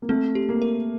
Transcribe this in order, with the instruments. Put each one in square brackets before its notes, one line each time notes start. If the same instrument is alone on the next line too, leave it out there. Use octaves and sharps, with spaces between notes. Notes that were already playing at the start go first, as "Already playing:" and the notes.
[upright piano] A#3
[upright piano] A3 [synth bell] C4
[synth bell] G4
[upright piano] A#3
[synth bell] A#4